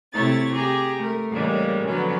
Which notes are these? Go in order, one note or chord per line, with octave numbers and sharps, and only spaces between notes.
C3 A3 E4 C#5 A6
G4 G#4 A#5
A3 A#4
A2 C#3 E3 G3 G#3 A#3
D3 F3 F#3 B3 C#4